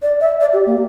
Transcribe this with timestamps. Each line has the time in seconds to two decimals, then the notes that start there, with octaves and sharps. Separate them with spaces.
0.02 D5
0.21 E5
0.41 D5
0.53 G4
0.66 A#3